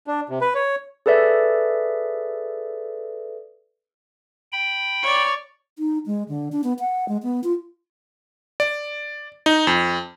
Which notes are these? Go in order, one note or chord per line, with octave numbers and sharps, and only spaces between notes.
D4
C3
B4
C#5
G#4 A4 B4 D5 E5
G5 B5
C#5 D5
D#4
G#3
D3
D4
B3
F#5
G#3
B3
F4
D5
D#4
F2